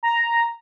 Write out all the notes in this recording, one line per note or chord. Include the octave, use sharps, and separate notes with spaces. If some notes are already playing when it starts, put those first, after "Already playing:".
A#5